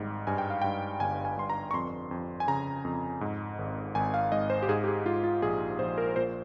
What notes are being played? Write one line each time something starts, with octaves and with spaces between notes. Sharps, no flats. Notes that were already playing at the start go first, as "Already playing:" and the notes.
Already playing: G#1 G#2 G3
G2 G#5
G5
F5
G2 G5
G1 G#5
G#5
G2 C6
A#5
C#6
F2 C6
F2
G#5
C#3 A#5
F2
G#2
G#1
G#1 G#5
F5
G#2 D#5
C5
G4
G#2 G#4
G4
G#4
G#2 F4
F4
A#1 G#4
A#1 C5
A#4
A#2 C5